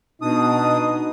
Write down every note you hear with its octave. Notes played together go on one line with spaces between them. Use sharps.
B2 D4 D#4 D#6